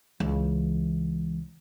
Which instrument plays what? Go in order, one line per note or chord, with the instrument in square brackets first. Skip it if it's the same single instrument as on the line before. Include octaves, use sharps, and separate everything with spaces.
[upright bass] C#2 E3